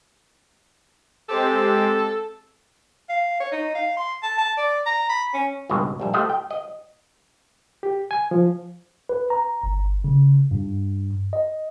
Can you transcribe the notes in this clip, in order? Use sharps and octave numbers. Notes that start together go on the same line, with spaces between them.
G#3 C4 G4 A4
F5
C#5
D#4
F5
C6
A5
A5
D5
A#5
B5
C#4
G#1 C#2 G2 B2 G#3
A#1 D#2 G3 E5
A3 G4 A4 C5 D#5 F5
G5
D#5
G4
G#5
F3
B4
A#5
G1
C#3
G2
D#5